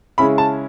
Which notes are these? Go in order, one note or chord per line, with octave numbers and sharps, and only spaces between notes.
C#3 G#3 C#4 E4 B5
A5